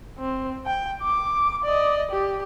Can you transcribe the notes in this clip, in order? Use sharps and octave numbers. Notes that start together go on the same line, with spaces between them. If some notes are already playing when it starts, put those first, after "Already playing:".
C4
G5
D6
D5 D#5
G4